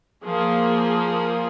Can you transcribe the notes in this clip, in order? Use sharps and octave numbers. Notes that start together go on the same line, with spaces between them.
F3 A#3 F4 G#4